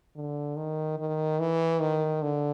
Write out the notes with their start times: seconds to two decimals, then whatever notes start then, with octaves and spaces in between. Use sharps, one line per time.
0.16 D3
0.56 D#3
0.99 D#3
1.40 E3
1.81 D#3
2.23 D3